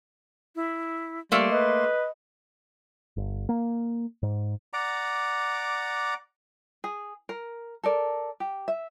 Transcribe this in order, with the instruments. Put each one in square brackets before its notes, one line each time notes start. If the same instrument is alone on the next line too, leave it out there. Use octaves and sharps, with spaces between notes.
[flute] E4
[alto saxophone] G3 [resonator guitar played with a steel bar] A3 A#3 [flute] C6
[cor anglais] B4 [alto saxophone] D#5
[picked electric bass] G1
A#3
G#2
[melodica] D5 F#5 A#5 D6
[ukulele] G#4
A#4
A4 A#4 D5
G4
E5